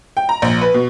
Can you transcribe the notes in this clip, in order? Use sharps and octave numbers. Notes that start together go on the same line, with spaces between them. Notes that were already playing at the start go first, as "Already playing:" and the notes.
G5
A#5
A#1
B4
B2